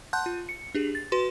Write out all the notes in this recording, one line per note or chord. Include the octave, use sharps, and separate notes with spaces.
F#5 A5 C6 F#6 G6
F4
C#7
D4 G4 G#4
A6
F#4 B4 C6